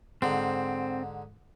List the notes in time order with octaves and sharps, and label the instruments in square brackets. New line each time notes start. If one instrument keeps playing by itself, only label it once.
[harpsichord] G#2 D3 [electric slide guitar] C4